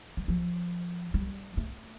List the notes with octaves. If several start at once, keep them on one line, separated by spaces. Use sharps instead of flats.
G3
F3
G3
A3